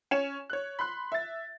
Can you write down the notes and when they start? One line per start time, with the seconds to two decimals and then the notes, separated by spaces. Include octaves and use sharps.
0.11 C#4 C#5 E7
0.50 C#5 F#6
0.79 B5 C6 F#6
1.12 E5 A6